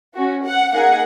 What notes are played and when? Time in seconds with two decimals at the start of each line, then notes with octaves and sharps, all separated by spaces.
0.14 C#4 F#4
0.43 F#5
0.73 A#3 D#4 G#4 F#5